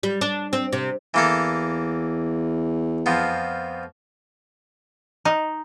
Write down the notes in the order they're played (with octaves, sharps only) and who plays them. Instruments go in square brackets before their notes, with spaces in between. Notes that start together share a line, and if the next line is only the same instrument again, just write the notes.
[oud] G3
D4
C4
C3
[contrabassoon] E2 [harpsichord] E3 A#3 A4
[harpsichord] F2 F3 B3
[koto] D#4